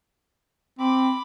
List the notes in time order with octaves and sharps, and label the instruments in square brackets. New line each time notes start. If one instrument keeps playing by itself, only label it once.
[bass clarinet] C4 [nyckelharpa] B5 D6